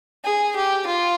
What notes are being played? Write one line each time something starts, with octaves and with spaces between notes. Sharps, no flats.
G#4
G4
F4